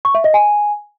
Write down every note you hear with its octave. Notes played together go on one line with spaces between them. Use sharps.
C#6
E5
D#5
G#5